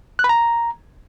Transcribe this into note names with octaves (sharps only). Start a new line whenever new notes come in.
F#6
B5
A#5